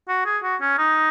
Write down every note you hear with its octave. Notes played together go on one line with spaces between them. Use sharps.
F#4
G#4
F#4
C#4
D#4